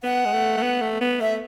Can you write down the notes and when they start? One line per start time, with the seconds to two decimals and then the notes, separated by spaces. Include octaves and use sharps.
0.03 B3 F#5
0.25 G#3
0.33 A3
0.57 A3
0.62 B3
0.81 A3
1.01 B3
1.20 A3 E5